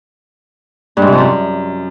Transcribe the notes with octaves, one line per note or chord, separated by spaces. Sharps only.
G2
G#2
C3
F2
F#2